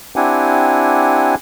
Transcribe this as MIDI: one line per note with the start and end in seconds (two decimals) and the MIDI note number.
0.16 1.35 60
0.16 1.35 62
0.16 1.35 64
0.16 1.35 67
0.16 1.35 78
0.16 1.35 80